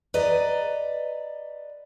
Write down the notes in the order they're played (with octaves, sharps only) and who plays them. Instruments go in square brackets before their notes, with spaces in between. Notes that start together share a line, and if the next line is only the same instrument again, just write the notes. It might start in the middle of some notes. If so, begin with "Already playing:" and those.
[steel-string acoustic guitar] B4 D5 D#5 A#5